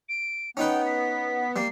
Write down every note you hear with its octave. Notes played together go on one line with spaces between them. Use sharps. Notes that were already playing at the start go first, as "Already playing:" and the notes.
D7
B3 C#4 D#4 B4 G5
B6
G3 A#3 C7